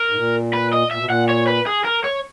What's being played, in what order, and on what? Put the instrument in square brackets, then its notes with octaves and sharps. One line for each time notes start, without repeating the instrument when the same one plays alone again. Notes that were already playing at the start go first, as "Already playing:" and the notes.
Already playing: [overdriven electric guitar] A#4
[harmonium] G#2
A#2
[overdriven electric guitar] B4
D#5
[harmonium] A#2 [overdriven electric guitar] E5
[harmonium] B2
[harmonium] A#2 [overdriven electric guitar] F#5
[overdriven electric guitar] C#5
B4
G#4
A#4
C#5